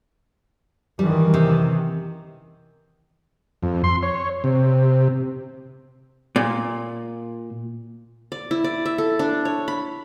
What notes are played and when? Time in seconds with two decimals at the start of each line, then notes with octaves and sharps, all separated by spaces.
0.99 D#3 E3 G3
1.34 C3
3.62 F2
3.84 C6
4.03 C#5
4.44 C3
6.36 A#2
8.32 D5
8.51 E4
8.64 D5
8.86 E5
8.98 A4
9.19 D4
9.45 C#5
9.68 B5